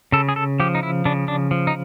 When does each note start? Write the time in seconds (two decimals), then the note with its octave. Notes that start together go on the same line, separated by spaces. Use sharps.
0.12 C#3 A4
0.29 G#4
0.36 A4
0.60 F3 G4
0.75 D#4
0.83 E4
1.05 C#3 D4
1.28 D4
1.51 F3
1.67 D#4